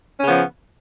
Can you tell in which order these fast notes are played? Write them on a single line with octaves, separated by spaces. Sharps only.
C#4 C#3 B3 F3